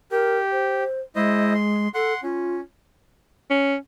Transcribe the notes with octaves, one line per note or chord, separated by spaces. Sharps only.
G4 A#4
C5
G#3 E4 C5 D#5
C6
A4 F#5 C6
C#4 F4
C#4